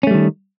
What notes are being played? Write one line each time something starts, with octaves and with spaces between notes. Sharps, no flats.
D#3 G3 A3 C#4